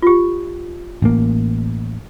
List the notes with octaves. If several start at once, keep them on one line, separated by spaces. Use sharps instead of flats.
F4 G4
A1 A#3